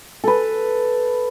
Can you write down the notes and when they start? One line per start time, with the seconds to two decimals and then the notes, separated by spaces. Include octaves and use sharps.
0.24 A4 B4